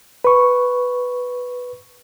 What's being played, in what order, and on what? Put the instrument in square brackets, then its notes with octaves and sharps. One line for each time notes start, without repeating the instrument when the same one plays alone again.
[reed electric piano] B4 C#6